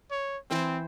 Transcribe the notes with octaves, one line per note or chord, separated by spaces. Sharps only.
C#5
E3 C4 C5 G5